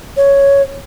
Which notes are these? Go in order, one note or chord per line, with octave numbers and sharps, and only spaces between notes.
C#5